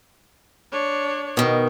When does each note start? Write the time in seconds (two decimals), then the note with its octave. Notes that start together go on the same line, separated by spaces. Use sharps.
0.72 D4 C#5
1.37 B2 D#3